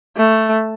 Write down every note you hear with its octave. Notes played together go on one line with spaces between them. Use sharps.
A3